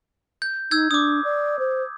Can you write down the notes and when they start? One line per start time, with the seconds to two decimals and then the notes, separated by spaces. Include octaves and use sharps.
0.42 G6
0.71 D#4 E6 G6 G#6
0.91 D4 D6 D#6
1.24 D5
1.59 C5